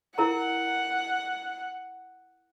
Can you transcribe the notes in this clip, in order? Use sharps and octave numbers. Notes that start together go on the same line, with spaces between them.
E4 A#4 F#5 A#5